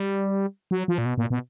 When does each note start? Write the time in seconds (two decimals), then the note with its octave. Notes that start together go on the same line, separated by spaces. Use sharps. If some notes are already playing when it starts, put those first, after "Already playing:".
Already playing: G3
0.71 F#3
0.88 F3
0.98 A#2
1.06 B2
1.18 A#2
1.30 B2